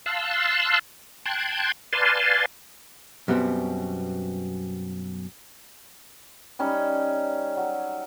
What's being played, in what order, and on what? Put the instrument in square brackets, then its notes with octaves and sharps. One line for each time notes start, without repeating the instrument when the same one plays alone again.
[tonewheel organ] F5 A5 C6 E6 F#6
G5 A5 C6 F#6 G#6
B4 D5 F5 G#5 A5 C6
[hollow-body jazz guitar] F#2 B2 G3 B3 C4
[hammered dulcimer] G3 C#4 D#4
F#3